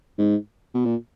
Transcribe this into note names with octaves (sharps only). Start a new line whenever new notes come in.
G#2
B2
A#2